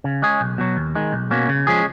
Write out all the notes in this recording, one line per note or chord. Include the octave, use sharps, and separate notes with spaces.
C#3
G#3 C#4 G#4
B1
B2 F#3
D#2
D#3 G#3
B1
B2 A#3 C#4
C#3
F3 G#3 C#4 G#4